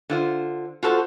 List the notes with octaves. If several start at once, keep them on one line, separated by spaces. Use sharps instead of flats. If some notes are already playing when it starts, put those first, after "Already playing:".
D3 F4 C5
F4 F#4 A4 A#4 C5